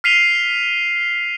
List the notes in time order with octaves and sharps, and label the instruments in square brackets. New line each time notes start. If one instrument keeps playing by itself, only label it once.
[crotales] F6 B6 C7 D#7 F7 G7